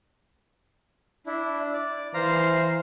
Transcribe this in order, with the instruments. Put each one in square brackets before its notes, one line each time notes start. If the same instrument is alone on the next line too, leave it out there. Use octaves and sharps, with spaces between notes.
[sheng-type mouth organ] D4 E4
D5
[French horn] E3 [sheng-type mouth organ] C5 F5 A#5